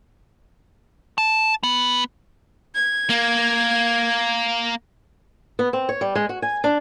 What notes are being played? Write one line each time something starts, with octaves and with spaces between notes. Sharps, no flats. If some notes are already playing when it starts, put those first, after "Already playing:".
A5
B3
G#6
A#3
B3
C4
C#5
G3
G#3
F#4
G#5
D4